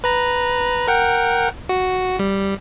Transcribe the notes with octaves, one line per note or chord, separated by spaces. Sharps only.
B4 A#5
A#4 F#5 G5
F#4
G3